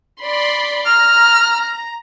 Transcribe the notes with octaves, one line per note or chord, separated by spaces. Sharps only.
D5 B5 C6
A#5 F6